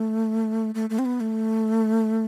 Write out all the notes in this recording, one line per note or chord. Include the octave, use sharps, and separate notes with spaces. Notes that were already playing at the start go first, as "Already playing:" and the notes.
Already playing: A3
A3
A3
C4
B3
A3